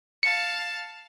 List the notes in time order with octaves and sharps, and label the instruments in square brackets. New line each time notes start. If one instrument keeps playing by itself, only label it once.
[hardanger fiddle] F5 A5 [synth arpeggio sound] C#7